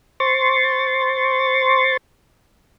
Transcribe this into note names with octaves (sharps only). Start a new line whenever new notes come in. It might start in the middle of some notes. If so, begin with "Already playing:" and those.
C5 C6 C#6 A6